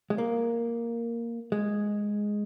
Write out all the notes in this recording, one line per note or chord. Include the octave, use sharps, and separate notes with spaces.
G#3
A#3
G#3